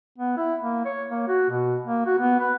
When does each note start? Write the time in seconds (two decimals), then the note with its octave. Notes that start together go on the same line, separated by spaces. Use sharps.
0.18 B3
0.37 E4
0.62 A#3
0.85 C#5
1.10 A#3
1.28 F#4
1.50 B2
1.84 A#3
2.06 F#4
2.19 B3
2.39 B4